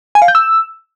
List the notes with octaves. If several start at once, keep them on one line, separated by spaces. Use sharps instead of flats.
G#5
F5
G6
E6